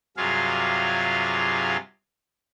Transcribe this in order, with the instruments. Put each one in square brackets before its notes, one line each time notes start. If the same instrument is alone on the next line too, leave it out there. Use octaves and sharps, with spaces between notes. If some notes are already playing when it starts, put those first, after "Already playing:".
[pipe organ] G2 C3 F#3 F4 G#4 F5